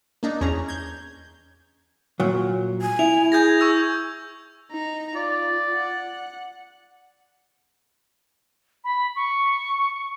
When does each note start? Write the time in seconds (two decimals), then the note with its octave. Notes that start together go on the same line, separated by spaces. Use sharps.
0.23 A#3 D4 D#4
0.41 E2 C#4 G#4 A#5
0.68 G6 G#6
2.20 A#2 F#3
2.81 G#5
2.99 E4 F7
3.32 G#4 G6 G#6 A#6
3.60 C#6 E6 F7
4.71 D#4 A#5
5.16 F4 D5
5.73 F#5
8.84 B5
9.16 C#6